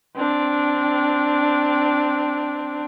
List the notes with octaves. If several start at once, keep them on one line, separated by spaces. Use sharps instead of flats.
C4 D4